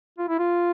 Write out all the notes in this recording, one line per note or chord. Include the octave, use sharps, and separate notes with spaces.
F4
E4
F4